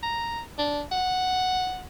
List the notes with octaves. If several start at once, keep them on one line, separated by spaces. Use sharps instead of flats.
A#5
D4
F#5